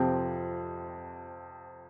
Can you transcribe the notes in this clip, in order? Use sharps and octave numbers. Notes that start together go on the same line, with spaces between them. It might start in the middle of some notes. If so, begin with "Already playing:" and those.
Already playing: F2 C3 F3 C4 G4